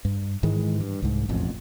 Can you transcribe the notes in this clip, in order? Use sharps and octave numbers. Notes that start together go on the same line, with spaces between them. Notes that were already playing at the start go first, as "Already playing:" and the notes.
G2
G#2 D#3 E3 G#3
G2
C2 G#2
E1 A1 F2